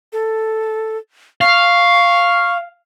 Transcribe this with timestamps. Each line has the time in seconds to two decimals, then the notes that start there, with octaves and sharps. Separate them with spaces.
0.13 A4
1.41 F5 C#6